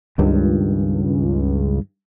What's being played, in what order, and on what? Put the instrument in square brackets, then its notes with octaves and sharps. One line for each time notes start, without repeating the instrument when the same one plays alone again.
[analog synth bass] C#2 [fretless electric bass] G2 D#3